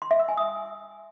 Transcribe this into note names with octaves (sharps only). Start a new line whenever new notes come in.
C6
E5
E6
G#5
D#6